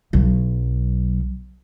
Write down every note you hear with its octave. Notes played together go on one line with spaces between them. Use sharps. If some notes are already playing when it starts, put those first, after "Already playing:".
B1 F#3